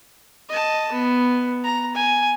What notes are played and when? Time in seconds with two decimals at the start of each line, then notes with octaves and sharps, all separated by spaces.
0.49 D#5 A5
0.92 B3
1.64 A#5
1.95 G#5